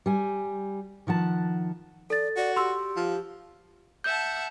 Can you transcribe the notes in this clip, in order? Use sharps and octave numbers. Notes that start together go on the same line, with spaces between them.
G3 G#5
D#3 F3 F#5 A5
A4 D5 A6
F#4 D5
G4 C6 E6
F3
E5 F#5 A5 G6